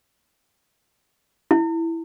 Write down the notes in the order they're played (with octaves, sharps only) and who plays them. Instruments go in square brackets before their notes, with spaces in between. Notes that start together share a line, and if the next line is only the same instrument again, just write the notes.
[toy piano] E4